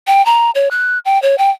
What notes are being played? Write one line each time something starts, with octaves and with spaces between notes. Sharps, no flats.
G5
A#5
C#5
F#6
G5
C#5
G5